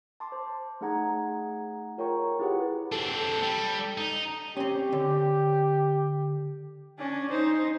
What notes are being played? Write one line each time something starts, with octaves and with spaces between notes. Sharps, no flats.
A5 C6 D6
C5
A3 D#4 G#4 F#5 A#5 G#6
F4 A#4 C#5 G5 A#5 C#6
E4 F4 G4 G#4 B4 F#5
C4 D4 A4
G3
D#4
C4 C#4 G4
D3
C#4 D4
D#4 C5